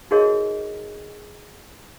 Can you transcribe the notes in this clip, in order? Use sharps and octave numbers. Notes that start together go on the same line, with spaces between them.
D#4 F#4 G#4 A#4 C#5 D#5